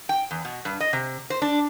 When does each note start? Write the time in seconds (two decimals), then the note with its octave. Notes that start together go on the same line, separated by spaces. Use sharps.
0.09 G5
0.31 E2
0.45 B2
0.65 G2
0.80 D#5
0.93 C3
1.30 C5
1.42 D4